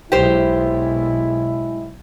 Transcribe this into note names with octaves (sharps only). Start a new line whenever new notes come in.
B1 G#3 E4 G4 C5